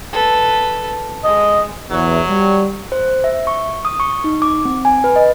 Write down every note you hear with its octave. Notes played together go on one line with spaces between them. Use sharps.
A4 B4
G#3 D#5
E2 F#3
G3
C5
E5
C#6
D#6
C#6
D#4
D6
C4
G#5
B4
D#5